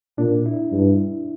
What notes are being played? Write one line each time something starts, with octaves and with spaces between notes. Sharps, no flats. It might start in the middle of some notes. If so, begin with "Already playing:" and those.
A#2 D4
E4
G2